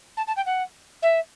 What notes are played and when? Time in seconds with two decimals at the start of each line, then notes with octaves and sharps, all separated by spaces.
0.17 A5
0.27 A5
0.36 G5
0.46 F#5
1.02 E5